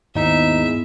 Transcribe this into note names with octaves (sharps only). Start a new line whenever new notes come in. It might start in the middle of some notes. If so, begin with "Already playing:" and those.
D#2 G#2 B3 D#4 E4 E5